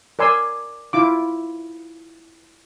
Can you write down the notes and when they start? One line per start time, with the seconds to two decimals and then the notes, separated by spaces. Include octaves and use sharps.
0.19 A#4 D5 G#5 C6 E6
0.93 E4 F4 D6